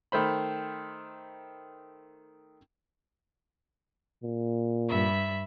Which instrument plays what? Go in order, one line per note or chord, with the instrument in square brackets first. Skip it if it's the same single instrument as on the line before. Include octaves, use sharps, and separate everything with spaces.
[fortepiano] D#3 A3 C5 B5
[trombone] A#2
[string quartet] G2 E5 B5